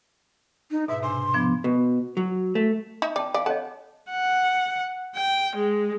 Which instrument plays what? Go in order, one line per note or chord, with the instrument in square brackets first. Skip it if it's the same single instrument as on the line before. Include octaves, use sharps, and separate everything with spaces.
[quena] D#4
[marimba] G#2 B2 [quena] E5
[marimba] C3 D4 G#5 [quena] C6
[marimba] F3 B3 D4
[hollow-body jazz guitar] B2
F#3
A3
[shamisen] D#4 E5
[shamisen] D5 [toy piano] G5 A5
[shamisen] D5 [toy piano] F5 G#5
[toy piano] A4 C#5 D#5 [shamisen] F#5 A5
[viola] F#5
G5
G#3